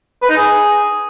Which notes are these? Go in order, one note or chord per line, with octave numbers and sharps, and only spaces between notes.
B4
D#4
G#4